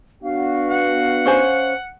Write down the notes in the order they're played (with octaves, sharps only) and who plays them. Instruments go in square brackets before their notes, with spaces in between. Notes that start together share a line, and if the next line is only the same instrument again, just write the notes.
[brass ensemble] B3 D4 F#4 [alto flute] F5
[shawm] F#5
[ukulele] C#4 C5 G#5